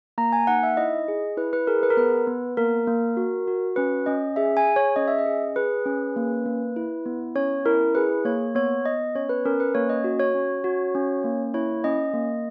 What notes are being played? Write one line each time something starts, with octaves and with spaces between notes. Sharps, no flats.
A#3 A#5
G#5
D#4 F#5
E5
E4 D#5
G#4
E4 B4
B4
G#4 A#4
B4
A#4
B3 B4
B3
A#3 A#4
A#3
F#4
F#4
C#4 B4
C#4 D#5
G#4 E5
G#5
G#4
C#5
C#4 D#5
E5
D#5
G#4
G#4 B4
C#4
A#3
A#3
E4
B3
C#4 C#5
E4 A#4
G#4 B4
A#3 C#5
B3 C#5
B3 D#5
C#4 C#5
B4
C#4 A#4
B4
A#3 C#5
D#5
F#4
C#5
C#4
F#4
C#4
A#3
E4 C#5
C#4 D#5
A#3